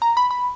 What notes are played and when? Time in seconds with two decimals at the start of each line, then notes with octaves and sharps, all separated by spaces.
0.02 A#5
0.17 B5
0.31 B5